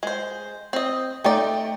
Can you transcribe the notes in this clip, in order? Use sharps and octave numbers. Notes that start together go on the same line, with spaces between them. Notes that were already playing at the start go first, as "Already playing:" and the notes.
G#3 C5
C4 D#5
A3 D#4 D5 G5